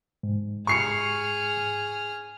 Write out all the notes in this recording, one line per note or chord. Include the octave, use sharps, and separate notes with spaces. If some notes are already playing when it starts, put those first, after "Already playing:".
G#2
G#4 C#6 F6 C7 C#7